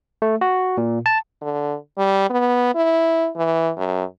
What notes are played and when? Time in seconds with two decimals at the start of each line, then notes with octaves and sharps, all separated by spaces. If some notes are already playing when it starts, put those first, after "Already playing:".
0.22 A3
0.41 F#4
0.77 A#2
1.06 A5
1.41 D3
1.98 G3
2.30 B3
2.75 E4
3.36 E3
3.77 F#2